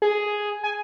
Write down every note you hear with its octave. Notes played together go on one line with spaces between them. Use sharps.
G#4
G#5